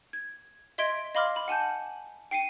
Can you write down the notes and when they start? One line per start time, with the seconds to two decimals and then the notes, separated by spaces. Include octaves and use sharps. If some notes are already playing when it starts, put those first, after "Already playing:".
0.13 G#6
0.78 D#5 E5 C6 G#6 B6 D7
1.15 D#5 F5 B5 C6 D6 F6
1.36 B5
1.48 F#5 G#5 A5 G6
2.31 G5 C7 C#7 D#7